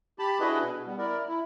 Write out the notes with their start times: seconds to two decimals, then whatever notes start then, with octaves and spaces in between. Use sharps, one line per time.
0.19 G4 A5 B5
0.40 D4 E4 F#4 G#4 B4 D#5
0.62 B2
0.86 G3 B3
0.98 E4 A#4 D5
1.28 E4